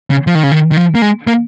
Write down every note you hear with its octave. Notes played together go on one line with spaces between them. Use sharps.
C#3
F3
D#3
C#3
D#3
D#3
F3
A#3
G#3
A#3